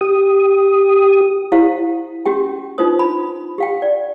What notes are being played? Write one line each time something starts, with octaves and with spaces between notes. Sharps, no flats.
G4 D#6
E4 G4 C5 F5
C#4 F#4 G4 G5
D4 D#4 F4 B4 C5 D#6
B5
G4 F5 G5
D5